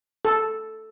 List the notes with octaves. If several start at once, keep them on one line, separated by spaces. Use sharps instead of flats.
A4